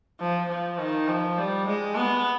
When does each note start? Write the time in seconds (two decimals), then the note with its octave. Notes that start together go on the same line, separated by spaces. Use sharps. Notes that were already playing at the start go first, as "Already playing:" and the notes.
0.20 F3
0.49 F3
0.79 D#3
1.08 F3
1.38 G3
1.67 G#3
1.96 B3